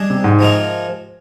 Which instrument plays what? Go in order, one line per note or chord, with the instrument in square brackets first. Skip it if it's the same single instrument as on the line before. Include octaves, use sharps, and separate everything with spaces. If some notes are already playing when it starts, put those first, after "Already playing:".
Already playing: [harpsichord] G3 D4 G#4 D#5
[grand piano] C3
G#2
[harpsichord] C3 F3 G#3 D#4 A#4